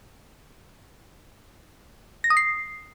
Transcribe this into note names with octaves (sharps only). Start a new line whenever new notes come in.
A#6
D#6
C7